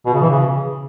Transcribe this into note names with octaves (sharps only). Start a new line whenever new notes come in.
B2
C#3
E3
C#3